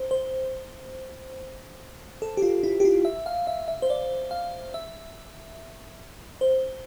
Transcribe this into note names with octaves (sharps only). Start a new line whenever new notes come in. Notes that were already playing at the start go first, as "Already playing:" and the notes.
Already playing: C5
C5
A4
G4
F4
E4
G4
F4
E5
F5
E5
E5
C5
D5
F5
E5
C5